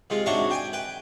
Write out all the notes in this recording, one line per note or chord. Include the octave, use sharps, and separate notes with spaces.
C3 G#3 F4
C3 D4 D#4 F#4 C#5 E5
G5 G#5
B4 G5